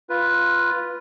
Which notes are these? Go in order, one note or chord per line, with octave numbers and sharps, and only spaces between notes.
F4 B4